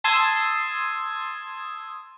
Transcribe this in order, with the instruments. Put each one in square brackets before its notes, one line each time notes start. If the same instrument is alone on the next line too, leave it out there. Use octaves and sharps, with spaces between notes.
[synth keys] A5 C6 D#6 E6 G#6